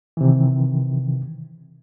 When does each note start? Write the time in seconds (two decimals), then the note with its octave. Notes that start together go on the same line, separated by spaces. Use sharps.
0.17 C3 D#3 E3